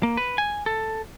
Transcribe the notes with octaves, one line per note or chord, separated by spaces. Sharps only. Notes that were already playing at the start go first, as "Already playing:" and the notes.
A#3
B4
G#5
A4